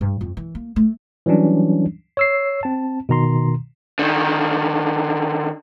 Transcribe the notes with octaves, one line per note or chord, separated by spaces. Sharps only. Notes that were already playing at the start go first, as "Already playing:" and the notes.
G2
F2
E3
A#3
A3
E3 F#3 G3 C#4 D4
C#5 E6 C7
C4 A5
B2 D#3 A#5 C6
D3 D#3